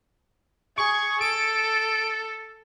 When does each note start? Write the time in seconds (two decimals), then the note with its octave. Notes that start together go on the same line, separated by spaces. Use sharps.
0.78 G#4 C#6
1.21 A4 D7